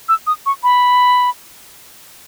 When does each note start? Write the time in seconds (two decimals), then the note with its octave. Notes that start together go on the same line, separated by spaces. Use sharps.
0.09 E6
0.27 D#6
0.46 C#6
0.63 B5